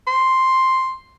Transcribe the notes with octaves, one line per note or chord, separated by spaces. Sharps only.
C6